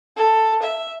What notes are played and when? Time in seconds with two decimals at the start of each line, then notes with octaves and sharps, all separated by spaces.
0.17 A4
0.63 E5